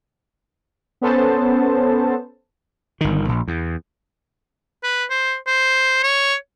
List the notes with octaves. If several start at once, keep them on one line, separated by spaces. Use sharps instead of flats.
B3 C#4 A4 C5 A5
G1 D#3
A#1
E2
B4
C5
C5
C#5